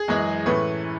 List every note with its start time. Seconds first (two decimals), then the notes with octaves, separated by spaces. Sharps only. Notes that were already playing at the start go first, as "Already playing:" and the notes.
Already playing: G#4
0.08 F#2 E3 G#3
0.46 A2 E3 A3 C#4 B4